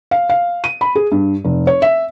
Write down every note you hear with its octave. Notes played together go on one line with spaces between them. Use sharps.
F5
F5
D#7
B5
G#4
G2
F1
C#5
E5